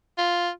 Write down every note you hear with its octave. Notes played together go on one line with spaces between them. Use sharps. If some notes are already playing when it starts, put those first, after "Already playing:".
F4